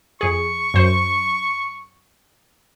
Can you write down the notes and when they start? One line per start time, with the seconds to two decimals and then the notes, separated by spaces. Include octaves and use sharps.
0.21 F2 G#4 C#6
0.74 F#2 C5